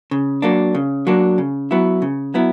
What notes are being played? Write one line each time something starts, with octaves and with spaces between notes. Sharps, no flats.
C#3
F#3 A#3 D4
C#3
F#3 A#3 D4
C#3
F#3 B3 E4
C#3
F#3 B3 E4